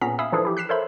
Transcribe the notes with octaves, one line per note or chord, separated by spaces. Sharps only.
A#2 B3 C#4 G#4 A#5 B6
E5 F5 G#5 B5 D#6 E6
E3 F3 D4 E4 G#4 A4
E4 G4
F#6 B6 C7 E7
A4 A#4 C5 C#5 E5 B5